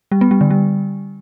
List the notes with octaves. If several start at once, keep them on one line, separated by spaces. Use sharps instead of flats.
G3
B3
G3
D3
G3